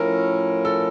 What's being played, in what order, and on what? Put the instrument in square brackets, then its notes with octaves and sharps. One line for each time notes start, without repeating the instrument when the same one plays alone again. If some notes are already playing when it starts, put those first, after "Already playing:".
Already playing: [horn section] A2 F3 C#4 E4 [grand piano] A#4
[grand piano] A4